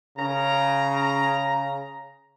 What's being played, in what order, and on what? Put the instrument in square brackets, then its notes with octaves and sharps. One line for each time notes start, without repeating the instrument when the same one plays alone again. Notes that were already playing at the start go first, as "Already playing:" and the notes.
[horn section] C#3 A#5